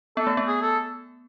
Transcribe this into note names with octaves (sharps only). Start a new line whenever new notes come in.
B3 A4
A3
B3
G#4
A4